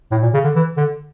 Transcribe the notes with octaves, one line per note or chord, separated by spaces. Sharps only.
A2
A#2
C#3
D3
E3
D3